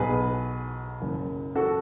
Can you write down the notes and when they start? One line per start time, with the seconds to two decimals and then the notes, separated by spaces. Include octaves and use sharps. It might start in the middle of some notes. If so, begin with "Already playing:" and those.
Already playing: B1 B2 G#4 B4
1.01 F#1 F#2 C#3
1.55 F#4 A4